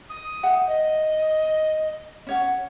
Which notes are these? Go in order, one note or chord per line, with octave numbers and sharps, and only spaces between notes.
D#6
E5 F#5 G5
D#5
C#4 C#5 F#5